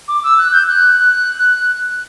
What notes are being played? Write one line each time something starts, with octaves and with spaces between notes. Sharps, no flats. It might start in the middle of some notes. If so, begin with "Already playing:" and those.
D6
E6
F#6
G6
F#6